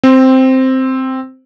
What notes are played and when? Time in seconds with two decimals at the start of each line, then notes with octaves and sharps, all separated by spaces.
0.04 C4